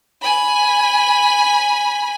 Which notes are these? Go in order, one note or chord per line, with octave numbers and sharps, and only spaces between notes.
G#5 B5